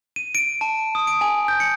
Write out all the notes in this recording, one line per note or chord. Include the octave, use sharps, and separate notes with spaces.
D#7
D7
A5
D#6
D7
G#5
G6
C#7